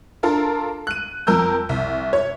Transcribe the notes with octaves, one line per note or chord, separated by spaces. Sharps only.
D4 F4 A4 A#4
F#6 D#7
F2 A#4 E6 G6
C2
C#5